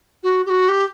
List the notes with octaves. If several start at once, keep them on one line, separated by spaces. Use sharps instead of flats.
F#4
G4
F#4
G4